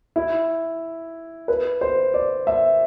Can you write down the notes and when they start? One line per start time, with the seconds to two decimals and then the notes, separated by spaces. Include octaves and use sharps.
0.16 E4
1.48 B4
1.81 C5
2.14 D5
2.47 E5